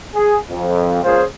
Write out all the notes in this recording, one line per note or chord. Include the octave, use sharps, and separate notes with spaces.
G#4
F2
C#2 A#2 C#4 F4 G#4 C5